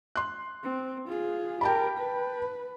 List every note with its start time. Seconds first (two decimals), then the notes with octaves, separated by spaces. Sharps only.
0.16 C6 F#6
0.63 C4
1.08 F4 G#4
1.61 G4 A#4 G5 A5 B5
1.98 B4